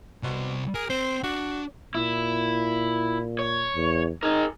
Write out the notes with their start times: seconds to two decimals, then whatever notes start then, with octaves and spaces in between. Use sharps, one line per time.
0.23 C2 B2 C5
0.75 G#4 A#4
0.90 C4 C5
1.23 D4 F#4
1.95 A#2 E4
3.39 C#5
3.75 E2
4.23 D#4 G#4 A#4